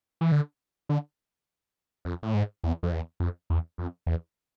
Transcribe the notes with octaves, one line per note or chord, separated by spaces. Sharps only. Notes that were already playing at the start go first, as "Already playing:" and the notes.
E3
D3
D3
F2
A2
G#2
E2
F2
E2
F2
E2
F2
E2